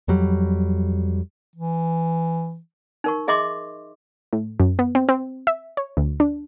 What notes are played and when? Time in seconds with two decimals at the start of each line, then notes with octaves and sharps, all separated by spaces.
0.08 F2 F#3 G3
1.56 E3
3.04 D#4 A#4 C#6
3.28 G#4 D#5 E5 C6 D6
4.33 A2
4.60 F#2
4.79 B3
4.95 C4
5.09 C4
5.47 E5
5.77 C#5
5.97 D2
6.20 D4